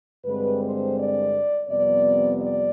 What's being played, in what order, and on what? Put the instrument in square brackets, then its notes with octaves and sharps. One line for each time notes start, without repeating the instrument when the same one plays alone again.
[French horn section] G2 D3 G#3 C4 B4
C5
D5
F2 C3 G3 B3 D5
D5